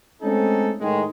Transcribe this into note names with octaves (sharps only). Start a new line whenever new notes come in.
G#3 A3 C4 C#4 D#4 A4
A2 D#3 G#3